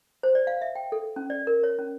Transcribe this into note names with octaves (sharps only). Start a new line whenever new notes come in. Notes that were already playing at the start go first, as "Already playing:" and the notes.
C5
D5
F5
E5
G5
A4
C#4
D5
A#4
C#5
C#4